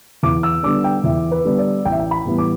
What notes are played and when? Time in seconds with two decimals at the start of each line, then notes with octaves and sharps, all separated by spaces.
0.23 E2 D6
0.43 E6
0.63 D3 G3 B3 D4 D6
0.84 G5
1.04 E2 E5
1.31 B4
1.45 D3 G3 B3 D4
1.58 D5
1.85 A1 G5
1.92 E5
2.00 G5
2.11 B5
2.25 A2 E3 G3 B3
2.38 D6